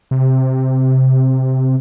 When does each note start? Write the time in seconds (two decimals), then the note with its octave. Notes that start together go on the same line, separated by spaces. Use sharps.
0.11 C3